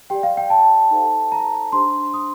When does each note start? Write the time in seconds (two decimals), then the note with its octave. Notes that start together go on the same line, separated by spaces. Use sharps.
0.10 G4 D5 G5
0.23 F5
0.37 G5
0.50 A5
0.91 D#4 A4 C5
1.32 A#5
1.72 D4 G4 C5 C6
2.14 D#6